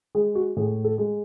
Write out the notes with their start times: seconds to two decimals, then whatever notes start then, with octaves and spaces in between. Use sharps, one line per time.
0.15 G#3 G#4
0.35 F#4
0.56 A2 G#4
0.84 A4
0.98 G#3